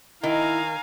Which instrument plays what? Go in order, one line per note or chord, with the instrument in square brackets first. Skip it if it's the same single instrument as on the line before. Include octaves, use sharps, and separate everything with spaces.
[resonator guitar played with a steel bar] D#3 [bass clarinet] E4 [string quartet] F5 G#5 A#5